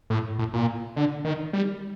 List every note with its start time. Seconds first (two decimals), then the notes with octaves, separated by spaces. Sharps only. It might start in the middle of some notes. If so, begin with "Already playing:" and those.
0.10 A2
0.39 A2
0.53 A#2
0.96 D3
1.25 D#3
1.53 G3